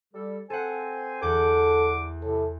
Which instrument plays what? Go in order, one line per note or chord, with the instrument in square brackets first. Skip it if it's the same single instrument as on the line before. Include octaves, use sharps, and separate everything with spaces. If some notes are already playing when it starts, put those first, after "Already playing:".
[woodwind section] G3 A4
[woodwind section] C4 C5 G#5 [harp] A4 F#5
[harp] E2 G6 [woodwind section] D3 F#5 D6 [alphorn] A4
[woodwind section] A2 C3 [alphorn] A4